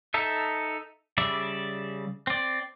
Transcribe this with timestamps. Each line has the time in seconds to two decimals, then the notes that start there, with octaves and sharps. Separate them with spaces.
0.14 D#4 A4 E5
1.18 C#3 G3 D5 E5
2.27 C4 D5